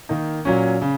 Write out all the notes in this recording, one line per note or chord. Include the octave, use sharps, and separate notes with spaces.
D#3 A#3 D#4
A#2 F#3 C#4
C#3